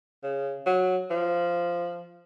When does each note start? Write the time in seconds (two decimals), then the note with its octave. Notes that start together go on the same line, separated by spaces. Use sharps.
0.23 C#3
0.66 F#3
1.10 F3